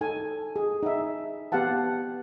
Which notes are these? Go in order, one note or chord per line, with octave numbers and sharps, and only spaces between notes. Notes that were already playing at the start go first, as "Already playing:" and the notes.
D#4 A4 G#5
G#4
D#4 E5
B3 G4 F5 F#5 A5